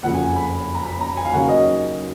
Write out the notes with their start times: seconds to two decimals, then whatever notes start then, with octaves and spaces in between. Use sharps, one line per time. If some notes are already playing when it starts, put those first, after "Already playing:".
0.03 F#1 F2 C#3 F#5
0.14 G#5
0.36 B5
0.75 A#5
0.84 B5
1.01 A#5
1.17 G#5
1.25 F5
1.33 D#2 C#3 F#3 F#5
1.49 D#5